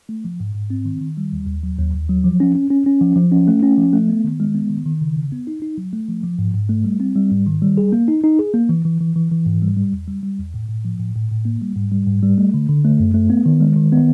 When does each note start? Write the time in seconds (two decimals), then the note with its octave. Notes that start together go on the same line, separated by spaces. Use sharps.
0.09 A3
0.24 F3
0.40 G#2
0.55 G#2
0.70 C4
0.85 D#3
1.01 D#3
1.17 G3
1.33 D#2
1.47 D#2
1.63 F#3
1.79 D#2
1.94 D#2
2.09 F#3
2.24 F3
2.40 C#4
2.55 C#4
2.70 C#4
2.86 C#4
3.01 F3
3.16 F3
3.32 C#4
3.48 A3
3.63 C#4
3.78 F3
3.93 A3
4.09 B3
4.24 D#3
4.40 G#3
4.54 B3
4.70 D#3
4.86 D#3
5.01 C#3
5.16 C#3
5.32 B3
5.47 D#4
5.62 D#4
5.78 F#3
5.93 A3
6.08 F3
6.23 F3
6.39 G#2
6.54 G#2
6.69 A3
6.85 G3
7.00 C4
7.16 G3
7.31 G#2
7.47 D#3
7.62 G3
7.77 G#4
7.92 A#3
8.08 D#4
8.24 D#4
8.39 G#4
8.54 A#3
8.69 E3
8.85 E3
9.01 E3
9.16 E3
9.31 E3
9.46 G#2
9.62 G3
9.76 G3
9.93 E2
10.08 G3
10.23 G3
10.38 E2
10.54 A2
10.69 A2
10.85 F3
10.99 A2
11.16 A2
11.31 A2
11.45 A#3
11.61 G3
11.76 G#2
11.92 G3
12.07 G#2
12.23 G3
12.38 A3
12.54 D3
12.69 D3
12.85 A3
12.99 F#2
13.14 A3
13.30 B3
13.46 D#3
13.61 G#3
13.76 D#3
13.92 B3